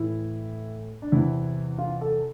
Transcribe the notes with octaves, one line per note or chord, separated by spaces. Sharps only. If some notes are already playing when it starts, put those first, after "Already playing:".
Already playing: A2 E3 E4
D4
E2 C3 E3 E4
F4
A4